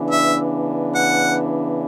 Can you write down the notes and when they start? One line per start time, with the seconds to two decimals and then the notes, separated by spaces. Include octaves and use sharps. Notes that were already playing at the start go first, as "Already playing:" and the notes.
Already playing: C#3 E3 B3 D4
0.10 E5
0.95 F#5